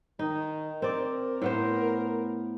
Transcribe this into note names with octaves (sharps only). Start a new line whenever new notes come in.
D#3 D#4
C4 A#4 D5
A2 B3 C5